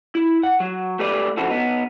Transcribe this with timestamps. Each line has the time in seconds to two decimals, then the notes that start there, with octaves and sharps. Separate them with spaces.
0.15 E4
0.43 F#5
0.60 F#3
0.99 A3 G4 B4 D5
1.37 F2 C#3 C4 E4 F#4 A4
1.50 B3 D#4